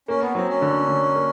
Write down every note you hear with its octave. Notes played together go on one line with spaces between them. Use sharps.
A#3 C#4
B3
F#3 C4
C#4
D3
D3
A#3